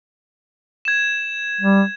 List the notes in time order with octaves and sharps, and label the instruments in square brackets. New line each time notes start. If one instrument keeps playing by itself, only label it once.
[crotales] G#6 E7
[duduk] G3